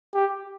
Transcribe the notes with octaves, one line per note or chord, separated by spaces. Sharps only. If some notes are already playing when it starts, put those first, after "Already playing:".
G4